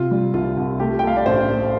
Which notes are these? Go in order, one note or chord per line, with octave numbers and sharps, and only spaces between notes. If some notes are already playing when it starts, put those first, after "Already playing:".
Already playing: C3 F4
G3
C2 F4
C2
A3 G4
G5
A3 F5
D5
A1 C5
A3